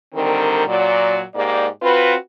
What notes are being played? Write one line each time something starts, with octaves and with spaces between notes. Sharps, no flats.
D3 D#3 G3 C4 A#4
A#2 F#3 D5
G#2 A#3 G4 D5
C4 F4 F#4 B4